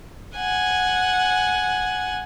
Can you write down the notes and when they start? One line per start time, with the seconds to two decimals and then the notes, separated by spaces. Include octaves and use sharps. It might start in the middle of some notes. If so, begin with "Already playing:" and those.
0.37 F#5 G#5